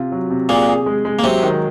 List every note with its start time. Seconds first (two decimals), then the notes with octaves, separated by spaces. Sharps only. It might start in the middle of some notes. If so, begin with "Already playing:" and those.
Already playing: C3 F4
0.12 F#3
0.31 C3
0.49 A#2 A#3 G#4
0.68 G#4
0.86 G#3
1.05 G#3
1.19 A#3
1.23 C3 F#3 C4
1.43 D#3